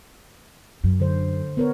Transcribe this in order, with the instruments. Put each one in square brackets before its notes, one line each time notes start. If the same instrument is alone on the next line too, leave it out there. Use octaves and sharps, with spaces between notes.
[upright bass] F#2
[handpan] D3 C5
B3 A#4 C#5